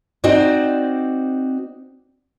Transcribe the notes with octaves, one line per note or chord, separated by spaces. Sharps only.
C4 D#4 F#4 C5 D5